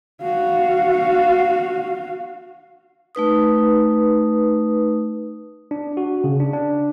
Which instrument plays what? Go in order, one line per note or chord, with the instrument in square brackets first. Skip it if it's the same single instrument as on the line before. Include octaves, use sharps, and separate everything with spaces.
[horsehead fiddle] F#4 F5
[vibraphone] A3 D#4 B4 D#6
[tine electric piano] D4
F#4
C#3
D4
D4